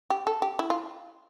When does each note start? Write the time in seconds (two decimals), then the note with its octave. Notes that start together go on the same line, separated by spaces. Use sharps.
0.10 G4
0.27 A4
0.42 G4
0.59 E4
0.70 F4